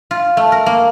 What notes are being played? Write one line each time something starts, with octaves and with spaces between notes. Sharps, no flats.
F4
A3
A#4
A#3